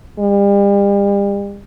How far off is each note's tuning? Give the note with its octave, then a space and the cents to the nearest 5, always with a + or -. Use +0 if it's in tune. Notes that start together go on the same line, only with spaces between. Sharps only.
G3 +40